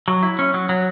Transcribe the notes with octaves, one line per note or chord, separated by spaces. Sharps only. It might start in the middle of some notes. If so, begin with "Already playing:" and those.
F#3
E4
C#4
F#3
F#3